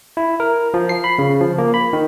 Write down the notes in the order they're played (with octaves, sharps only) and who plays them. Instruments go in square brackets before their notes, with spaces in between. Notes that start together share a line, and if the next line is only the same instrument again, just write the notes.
[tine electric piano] E4
A#4
F3
C7
B5
C#3
F3
A#3
B5
D#3